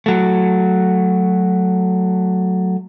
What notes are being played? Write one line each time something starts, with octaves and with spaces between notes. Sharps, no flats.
F#3 A3